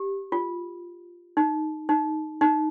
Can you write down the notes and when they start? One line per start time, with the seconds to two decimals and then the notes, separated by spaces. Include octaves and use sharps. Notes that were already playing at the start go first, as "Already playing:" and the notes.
Already playing: G4
0.32 F4
1.37 D#4
1.89 D#4
2.41 D#4